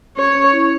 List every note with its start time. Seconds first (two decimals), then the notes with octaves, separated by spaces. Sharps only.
0.17 C#4 C#5
0.35 C#4
0.53 E4